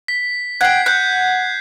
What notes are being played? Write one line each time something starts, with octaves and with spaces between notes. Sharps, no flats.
B6
F#5 G5 G#6 C7
F#5 F#6 G6